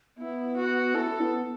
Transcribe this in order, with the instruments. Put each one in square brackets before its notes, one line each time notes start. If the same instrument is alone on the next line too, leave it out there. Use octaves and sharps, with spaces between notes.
[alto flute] B3 [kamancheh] E4
[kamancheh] F#4
[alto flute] E4 [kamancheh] A4
[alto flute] B3